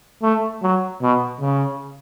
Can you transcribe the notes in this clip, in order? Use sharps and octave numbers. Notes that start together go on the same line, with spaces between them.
A3
F#3
B2
C#3